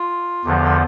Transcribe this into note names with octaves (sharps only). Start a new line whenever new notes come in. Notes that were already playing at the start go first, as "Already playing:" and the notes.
Already playing: F4
E2 D3 F3 G4
A4